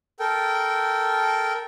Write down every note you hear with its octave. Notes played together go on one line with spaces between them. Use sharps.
A4 A#4 G5